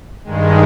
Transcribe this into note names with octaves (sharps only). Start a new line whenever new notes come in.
G2 D#3 G#3